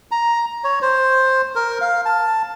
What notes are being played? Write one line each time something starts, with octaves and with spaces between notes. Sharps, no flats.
A#5
C#5
C5
A#4
F5
A5